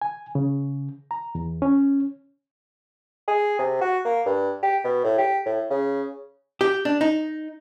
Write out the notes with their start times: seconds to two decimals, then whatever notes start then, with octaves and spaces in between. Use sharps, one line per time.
0.02 G#5
0.35 C#3
1.11 A#5
1.35 E2
1.62 C#4
3.28 G#4
3.59 C3
3.81 F#4
4.05 A#3
4.26 G2
4.62 G4
4.84 B2
5.04 A2
5.18 G4
5.46 A2
5.70 C#3
6.61 G4
6.85 D4
7.01 D#4